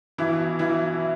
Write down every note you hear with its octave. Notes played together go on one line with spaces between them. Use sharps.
B1 B2 E3 E4
B1 B2 E3 E4